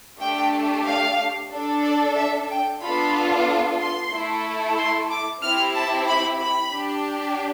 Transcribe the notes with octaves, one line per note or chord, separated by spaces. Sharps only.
A3 D4 G4 G5
F5
D4 A4
D5
E5
G5
B3 D4 F4 A4 B5
C6
A3 E4 A4
C6
D6
C4 E4 G4 F6
A5
B5
B5
D4 G4